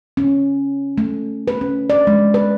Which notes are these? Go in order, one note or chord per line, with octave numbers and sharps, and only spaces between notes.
C#4
A3
B4
C#4
D5
G#3
B4